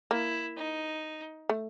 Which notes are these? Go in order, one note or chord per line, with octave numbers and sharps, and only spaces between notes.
A#3 E4
D#4
A3